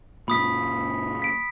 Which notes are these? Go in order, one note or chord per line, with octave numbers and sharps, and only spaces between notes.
F#1 A#2 B5 D#6 B6
B6 D7